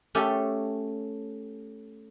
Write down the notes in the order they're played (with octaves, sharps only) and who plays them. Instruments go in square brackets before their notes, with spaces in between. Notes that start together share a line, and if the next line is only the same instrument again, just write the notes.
[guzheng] A3 C#4 G4 A4